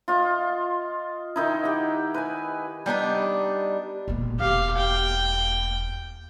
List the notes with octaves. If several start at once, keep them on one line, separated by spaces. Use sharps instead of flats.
F4 D#5
D#3 D#4 E4
G4 F#5
B4 G#5
G3 B3 D4 D#4
E1 A#2
E1 G4 F5
G5